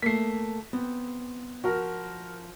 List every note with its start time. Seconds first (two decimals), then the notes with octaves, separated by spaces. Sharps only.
0.02 A3 A#3 B6 C7
0.73 B3 C4
1.64 F3 F#4 A#4